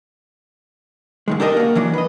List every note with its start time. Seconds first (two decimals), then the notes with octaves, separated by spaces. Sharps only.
1.28 G#2 D#3 G#3
1.40 D4 G4 A4 A#4 C#5 D#5
1.57 A#3 F#4
1.75 E3 F#3 D4
1.94 B4 D#5